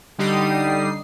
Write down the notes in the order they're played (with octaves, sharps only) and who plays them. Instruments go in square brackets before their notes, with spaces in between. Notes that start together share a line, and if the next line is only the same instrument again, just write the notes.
[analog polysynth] D3 G3 D#4 G4 D#6 C7